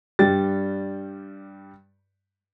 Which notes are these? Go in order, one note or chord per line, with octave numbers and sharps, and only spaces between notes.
G2 G3 G5 A6